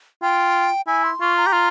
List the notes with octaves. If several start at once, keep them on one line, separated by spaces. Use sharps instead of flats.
F4 G5
E4 G#5
C6
F4 C#6
A#5
G4
F4